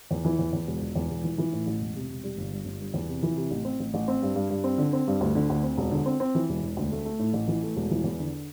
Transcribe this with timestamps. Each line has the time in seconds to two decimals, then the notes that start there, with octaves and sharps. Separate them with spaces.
0.11 E2
0.25 E3
0.39 E2
0.53 E2
0.67 E1
0.81 E1
0.95 E2
1.10 E1
1.24 E3
1.38 E3
1.52 A2
1.67 A1
1.80 E1
1.95 C3
2.09 E1
2.24 G3
2.38 G1
2.51 G2
2.65 G1
2.81 G2
2.94 E2
3.08 C3
3.23 E3
3.36 C3
3.51 A1
3.65 C4
3.79 A1
3.94 A1
4.08 C4
4.22 G2
4.35 G2
4.50 G2
4.64 C4
4.78 D3
4.93 C4
5.07 G2
5.21 D2
5.35 D3
5.50 D2
5.63 C4
5.77 E1
5.91 D3
6.06 C4
6.20 C4
6.35 E3
6.49 E1
6.62 E1
6.77 D2
6.91 A3
7.05 A3
7.19 A2
7.33 A1
7.48 E3
7.62 A3
7.76 E1
7.91 E3
8.04 E2
8.19 D3